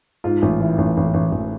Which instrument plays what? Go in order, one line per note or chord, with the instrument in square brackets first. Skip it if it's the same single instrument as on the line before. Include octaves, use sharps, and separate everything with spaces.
[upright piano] G#2 F4
A1
E3
A1
A1
A1
A1